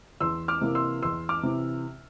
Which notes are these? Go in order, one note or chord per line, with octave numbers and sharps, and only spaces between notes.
E2 C6 E6
D6 F6
C3 E3 A#3
C6 E6
E2 C6 E6
D6 F6
C3 E3